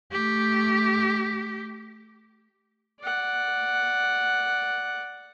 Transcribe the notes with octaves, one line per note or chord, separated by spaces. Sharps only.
A3 G4
D5 F#5